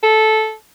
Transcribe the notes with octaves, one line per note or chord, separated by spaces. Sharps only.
A4